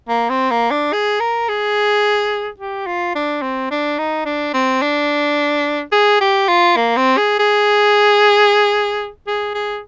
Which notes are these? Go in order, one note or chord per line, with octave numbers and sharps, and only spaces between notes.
A#3
C4
A#3
D4
G#4
A#4
G#4
G4
F4
D4
C4
D4
D#4
D4
C4
D4
G#4
G4
F4
A#3
C4
G#4
G#4
G#4
G#4